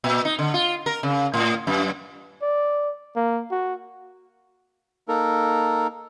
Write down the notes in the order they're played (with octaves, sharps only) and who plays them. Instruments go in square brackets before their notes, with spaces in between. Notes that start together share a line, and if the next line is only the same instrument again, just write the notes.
[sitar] A#2
D#4
D3
F4
A#4
C#3
A2
F#2
[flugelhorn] D5
A#3
F#4
[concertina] A#3 D#4 A4 A#4